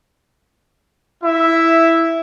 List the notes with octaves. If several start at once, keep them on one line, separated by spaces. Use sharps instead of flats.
E4 E5